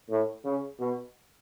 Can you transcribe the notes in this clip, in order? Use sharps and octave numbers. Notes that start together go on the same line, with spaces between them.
A2
C#3
B2